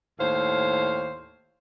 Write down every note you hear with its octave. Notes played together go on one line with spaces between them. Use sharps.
D#2 A2 C5 C#5 F5